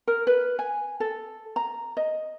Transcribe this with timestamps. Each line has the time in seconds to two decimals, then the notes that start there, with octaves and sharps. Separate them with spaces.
0.07 A#4
0.27 B4
0.59 G#5
1.00 A4
1.56 A#5
1.97 D#5